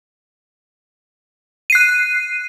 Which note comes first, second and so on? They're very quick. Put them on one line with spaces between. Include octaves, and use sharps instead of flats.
D#7 C7 F#6